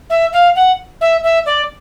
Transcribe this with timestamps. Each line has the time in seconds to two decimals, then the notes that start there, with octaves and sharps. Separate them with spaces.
0.09 E5
0.32 F5
0.55 F#5
1.00 E5
1.23 E5
1.45 D5